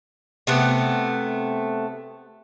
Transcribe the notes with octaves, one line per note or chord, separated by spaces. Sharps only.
C3 A3 B3